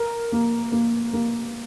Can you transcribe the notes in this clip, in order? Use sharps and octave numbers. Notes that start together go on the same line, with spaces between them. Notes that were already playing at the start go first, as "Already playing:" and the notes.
Already playing: A#4
A#3
A#3
A#3